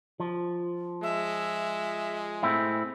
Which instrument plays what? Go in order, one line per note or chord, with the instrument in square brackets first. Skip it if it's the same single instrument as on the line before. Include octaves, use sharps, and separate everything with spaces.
[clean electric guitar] F3
[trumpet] G#3 [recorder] E5
[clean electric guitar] A2 C4 E4